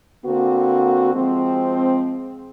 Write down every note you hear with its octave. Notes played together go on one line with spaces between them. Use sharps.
D3 A#3 C4 F#4
F3 G#3 C4